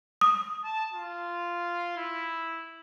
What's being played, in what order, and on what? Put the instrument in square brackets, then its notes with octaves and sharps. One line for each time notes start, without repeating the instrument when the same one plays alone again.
[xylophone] D#6
[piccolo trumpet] A5
F4
E4